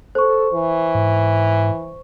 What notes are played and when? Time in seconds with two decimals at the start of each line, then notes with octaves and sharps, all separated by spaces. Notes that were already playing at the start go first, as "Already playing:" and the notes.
0.15 A4 C5 C#6
0.54 E3
0.95 G#2